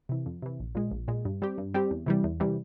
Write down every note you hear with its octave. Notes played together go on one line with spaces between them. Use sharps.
C3 E3
F2
C3 E3
A#1
A#2 G#3
A#1
A#2 G#3
G2
G3 C4 G4
G2
G3 C4 G4
E2
C3 E3 G3
E2
C3 E3 G3